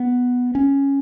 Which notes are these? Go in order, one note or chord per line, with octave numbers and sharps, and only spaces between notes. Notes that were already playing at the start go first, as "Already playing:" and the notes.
Already playing: B3
C#4